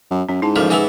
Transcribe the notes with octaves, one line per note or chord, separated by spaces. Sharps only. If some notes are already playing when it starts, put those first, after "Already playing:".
F#2
F#2 C#4
G#2 E4 A5
A1 F3 G3 C#4 A4 A#4
E3 B3 E4 G#4 G#5